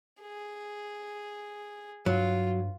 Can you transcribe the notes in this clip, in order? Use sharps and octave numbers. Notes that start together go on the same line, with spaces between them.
G#4
G2 F#3 F4